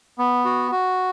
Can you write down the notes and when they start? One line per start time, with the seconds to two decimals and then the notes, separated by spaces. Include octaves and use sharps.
0.18 B3
0.45 F#4
0.72 F#4